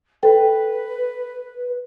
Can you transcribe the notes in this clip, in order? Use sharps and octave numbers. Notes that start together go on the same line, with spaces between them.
A4 B4 G5